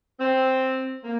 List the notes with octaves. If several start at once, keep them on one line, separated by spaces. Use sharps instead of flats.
C4
A#3